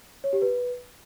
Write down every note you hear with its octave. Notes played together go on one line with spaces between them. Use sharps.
C#5
G4
B4